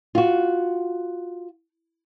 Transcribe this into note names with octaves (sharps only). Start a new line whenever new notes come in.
F4 F#4